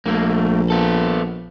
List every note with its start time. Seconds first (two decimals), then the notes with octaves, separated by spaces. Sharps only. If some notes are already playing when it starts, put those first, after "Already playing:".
0.06 A#1 A3 A#3
0.70 B3 A4